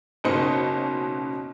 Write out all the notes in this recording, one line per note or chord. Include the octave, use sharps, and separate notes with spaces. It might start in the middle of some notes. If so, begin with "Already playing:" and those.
F#1 B2 C#4 D#4 C5 C#7